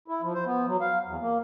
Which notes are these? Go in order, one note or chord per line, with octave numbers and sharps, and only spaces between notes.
E4
F3
C5
B3
F#3
F5
E2
A#3